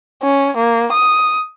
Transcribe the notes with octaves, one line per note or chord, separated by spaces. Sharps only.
C#4
A#3
D#6